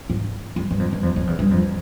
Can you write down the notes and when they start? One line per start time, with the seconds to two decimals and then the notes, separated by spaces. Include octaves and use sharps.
0.10 G#2
0.56 G2
0.71 G2
0.79 F2
0.93 G2
1.03 F2
1.16 F2
1.27 E2
1.39 G2
1.51 F2